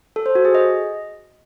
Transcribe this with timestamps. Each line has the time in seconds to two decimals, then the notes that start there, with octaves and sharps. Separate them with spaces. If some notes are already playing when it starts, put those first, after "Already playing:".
0.16 A4
0.26 C5
0.35 F#4
0.45 G#4
0.55 D#5